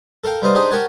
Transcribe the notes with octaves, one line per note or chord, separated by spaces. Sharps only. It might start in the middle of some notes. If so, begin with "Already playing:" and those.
A4 A#4 F5 G5
G3 B3 D#4 C5 D#5 F5
D4 D#4 G4 G#4 C5 D#5
G4 A#4 C#5 F#5 G#5 A5